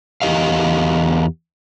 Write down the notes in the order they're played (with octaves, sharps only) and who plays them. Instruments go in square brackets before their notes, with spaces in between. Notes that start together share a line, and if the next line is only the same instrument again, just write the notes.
[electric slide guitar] E2 G4 D#5 F5